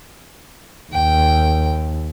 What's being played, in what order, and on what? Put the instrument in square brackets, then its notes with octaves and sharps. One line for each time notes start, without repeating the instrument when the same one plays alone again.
[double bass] D#2 [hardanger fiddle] G5